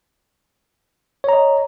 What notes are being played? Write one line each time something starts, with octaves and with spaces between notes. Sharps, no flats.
C#5 D#5 A#5